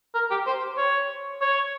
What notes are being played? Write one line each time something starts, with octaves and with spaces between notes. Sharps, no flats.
A#4
G4
C5
C#5
C#5